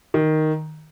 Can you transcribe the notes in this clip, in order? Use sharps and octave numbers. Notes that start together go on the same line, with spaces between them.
D#3